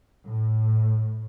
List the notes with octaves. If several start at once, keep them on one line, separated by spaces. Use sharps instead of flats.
A2